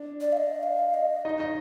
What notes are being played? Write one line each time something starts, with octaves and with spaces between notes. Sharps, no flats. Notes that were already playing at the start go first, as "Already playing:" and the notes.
Already playing: D4
D5
F5
D#5
F5
D#5
D#4 D#5
D#5